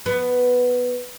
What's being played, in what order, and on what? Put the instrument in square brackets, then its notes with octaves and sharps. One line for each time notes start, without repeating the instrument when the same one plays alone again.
[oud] B3